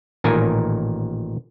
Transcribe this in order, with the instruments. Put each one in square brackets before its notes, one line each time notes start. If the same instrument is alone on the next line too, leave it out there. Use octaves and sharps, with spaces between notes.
[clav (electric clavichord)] A1 A#2 D#3 A#4 G#5